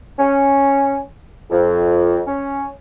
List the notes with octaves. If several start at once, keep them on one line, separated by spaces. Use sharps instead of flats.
C#4
F2
C#4